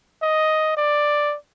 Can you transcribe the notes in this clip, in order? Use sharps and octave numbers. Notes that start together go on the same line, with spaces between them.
D#5
D5